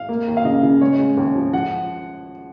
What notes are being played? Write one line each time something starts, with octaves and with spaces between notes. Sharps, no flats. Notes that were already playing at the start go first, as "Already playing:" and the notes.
Already playing: F5
A#3
D#2
F5
C#3 D#5
C#3
G#3 C#5
G#3
D#2
F3
F3 F#5